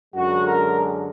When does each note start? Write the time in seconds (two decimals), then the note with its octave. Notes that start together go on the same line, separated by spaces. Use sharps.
0.14 F#2 D3 G#3 F#4
0.43 A#4